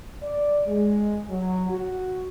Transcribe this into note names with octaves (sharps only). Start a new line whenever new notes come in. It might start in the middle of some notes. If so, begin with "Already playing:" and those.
D5
G#3
F#3
F#4